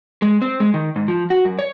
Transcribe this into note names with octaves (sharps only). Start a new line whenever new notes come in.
G#3
C4
G#3
D#3
G#2
F3
F#4
F#2
C#5